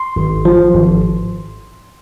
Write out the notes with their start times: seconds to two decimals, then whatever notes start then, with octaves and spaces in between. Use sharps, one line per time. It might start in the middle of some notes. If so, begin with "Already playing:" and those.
Already playing: C6
0.16 G#1
0.45 F3
0.74 G#1